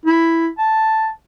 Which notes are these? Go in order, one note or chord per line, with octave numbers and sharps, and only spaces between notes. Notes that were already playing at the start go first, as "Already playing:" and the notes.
E4
A5